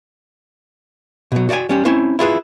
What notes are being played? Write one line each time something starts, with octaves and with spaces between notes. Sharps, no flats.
B2 F#3
F#4 D5 F5 G5 G#5
G3 C#4 G4
C4 C#4 E4 C5
E4 F4 G#4 B4